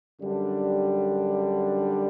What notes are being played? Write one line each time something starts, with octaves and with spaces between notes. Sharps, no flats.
F#2 D3 G3 D4